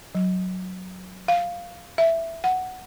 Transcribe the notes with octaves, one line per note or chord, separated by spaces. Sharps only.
F#3
F5
E5
F#5